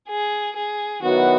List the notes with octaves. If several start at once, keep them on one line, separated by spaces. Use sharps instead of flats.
G#4
G#4
D#3 F#3 B3 E4 F#4